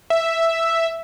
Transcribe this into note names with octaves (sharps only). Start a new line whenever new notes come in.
E5